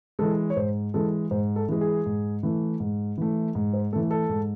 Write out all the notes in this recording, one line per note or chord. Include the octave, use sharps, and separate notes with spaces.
E3 G#3 A4
C#5
G#2 C5
E3 G#3 A4
G#2 C5
A4
E3 G#3
G#4
G#2
E3 A3
G#2
E3 A3
G#2
C5
E3 A3 A4
A4
G#2